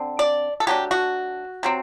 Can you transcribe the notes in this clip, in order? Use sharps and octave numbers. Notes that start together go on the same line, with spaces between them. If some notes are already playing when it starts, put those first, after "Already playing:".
Already playing: D3 C4
D5
A4
F#3 A3 D4 G4
F#4
C3 F#3 C4